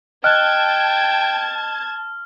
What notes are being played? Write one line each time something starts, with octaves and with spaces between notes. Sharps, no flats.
D#5 G5 A5 F6 F#6 G#6